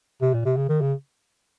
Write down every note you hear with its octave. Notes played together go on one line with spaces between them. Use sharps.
C3
A#2
C3
C#3
D#3
C#3